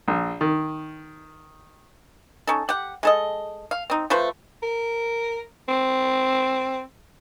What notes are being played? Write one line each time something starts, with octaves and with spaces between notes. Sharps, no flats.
A#1
D#3
C#4 D#4 A4
G4 F#5
G#3 A4 D#5
F5
C4 D#4
F3 A3 B4 C5
A#4
C4